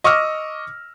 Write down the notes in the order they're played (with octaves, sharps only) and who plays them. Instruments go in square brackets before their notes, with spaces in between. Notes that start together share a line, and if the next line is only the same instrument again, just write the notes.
[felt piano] D#5 C#6 D6 E6 F6 A#6